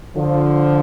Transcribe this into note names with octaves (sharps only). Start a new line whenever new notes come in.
D3 F3